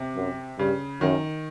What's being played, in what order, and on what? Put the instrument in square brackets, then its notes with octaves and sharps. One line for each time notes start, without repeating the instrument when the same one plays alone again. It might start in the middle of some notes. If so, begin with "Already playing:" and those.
Already playing: [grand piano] C3
[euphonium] F#2
[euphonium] G2 [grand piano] C#3
[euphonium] F#2 [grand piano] D#3